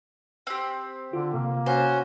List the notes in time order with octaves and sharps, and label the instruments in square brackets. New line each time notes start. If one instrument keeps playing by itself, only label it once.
[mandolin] C4 G4
[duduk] D3 [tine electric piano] F4
[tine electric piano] C3 [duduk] A#3
[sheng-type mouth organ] C#4 F#4 [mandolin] C5